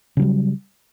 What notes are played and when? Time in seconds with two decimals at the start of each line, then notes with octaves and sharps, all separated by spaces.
0.17 C#3
0.19 F#3
0.22 G3